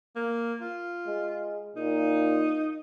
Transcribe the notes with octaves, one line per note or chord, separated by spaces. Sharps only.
A#3
F4
G#3
A#2 D#4